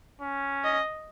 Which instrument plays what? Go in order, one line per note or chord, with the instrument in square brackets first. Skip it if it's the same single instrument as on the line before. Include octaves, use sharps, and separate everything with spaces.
[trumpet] C#4
[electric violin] D#5